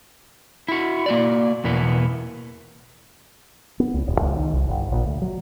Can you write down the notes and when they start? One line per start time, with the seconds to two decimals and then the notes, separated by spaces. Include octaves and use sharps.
0.69 E4 F#4
1.06 A#3 F#4 D5
1.64 E2 B2 E3 A#3 B3
3.80 B3
3.94 C#2
4.07 D#1
4.21 C#2
4.36 D#3
4.54 C2
4.69 G1
4.92 A#1
5.06 D2
5.22 F#3